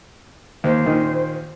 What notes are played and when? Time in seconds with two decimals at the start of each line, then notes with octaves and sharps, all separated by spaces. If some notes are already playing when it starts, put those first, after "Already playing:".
0.64 D#2 C5
0.86 D#2 A#2 D#3